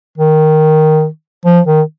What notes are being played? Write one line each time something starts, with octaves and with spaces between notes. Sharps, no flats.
D#3
F3
D#3